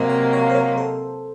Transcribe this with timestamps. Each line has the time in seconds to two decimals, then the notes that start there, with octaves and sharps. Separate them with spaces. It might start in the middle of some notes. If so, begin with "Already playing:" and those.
Already playing: C3 F#3 A#3 C5 D#5
0.10 C#5 F5
0.33 C#5 F5
0.50 C5
0.55 A#4 C#5
0.77 A4 C5